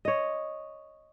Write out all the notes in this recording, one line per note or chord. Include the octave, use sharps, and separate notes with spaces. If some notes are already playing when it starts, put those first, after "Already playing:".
C#5 D#5